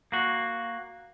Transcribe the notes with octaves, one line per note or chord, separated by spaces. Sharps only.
A#3 F#4